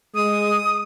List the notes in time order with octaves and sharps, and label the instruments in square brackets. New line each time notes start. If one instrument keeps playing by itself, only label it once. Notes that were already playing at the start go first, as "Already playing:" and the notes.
[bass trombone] G#3 [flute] D#6